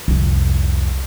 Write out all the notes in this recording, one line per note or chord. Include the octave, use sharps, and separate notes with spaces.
C2 F2